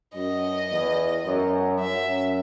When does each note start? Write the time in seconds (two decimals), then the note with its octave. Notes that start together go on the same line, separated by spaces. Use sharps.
0.14 F#2 D#5
0.70 E2
1.25 F#2
1.80 F#2 E5